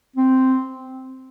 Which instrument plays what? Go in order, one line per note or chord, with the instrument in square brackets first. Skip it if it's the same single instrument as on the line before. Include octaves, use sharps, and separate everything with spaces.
[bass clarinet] C4